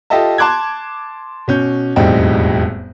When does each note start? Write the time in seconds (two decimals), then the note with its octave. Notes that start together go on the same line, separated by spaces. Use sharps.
0.10 F4 G4 A4 D#5 E5 A5
0.38 A5 C6 D6 F#6 G#6
1.48 B2 C#4 G6
1.96 E1 F2 A2 G3 C4 D#4